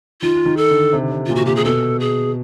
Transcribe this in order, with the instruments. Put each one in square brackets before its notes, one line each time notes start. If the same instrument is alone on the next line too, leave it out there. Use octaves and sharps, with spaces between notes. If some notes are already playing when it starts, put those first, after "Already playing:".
[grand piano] D#3 [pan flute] F4
[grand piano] D#3
[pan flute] A4
[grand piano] D3
C3
C3
[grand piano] A#2 [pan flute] F4
[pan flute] F#4
[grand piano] A#2 [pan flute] G4
[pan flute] G#4
[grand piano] B2 [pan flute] A4
[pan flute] G#4